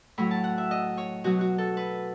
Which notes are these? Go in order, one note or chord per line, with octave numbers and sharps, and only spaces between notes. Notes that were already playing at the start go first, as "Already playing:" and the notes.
A2 F#3 B5
A5
F#5
E5
D#5
C#5
B2 F#3 F#4
F#4
A4
B4